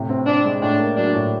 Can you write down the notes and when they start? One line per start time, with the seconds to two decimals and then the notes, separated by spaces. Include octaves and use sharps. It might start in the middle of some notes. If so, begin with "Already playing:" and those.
Already playing: A2 C3
0.09 C4
0.26 C4 D4
0.45 G#3
0.62 A2 D4
0.80 A#3
0.96 F#3 D4
1.14 A2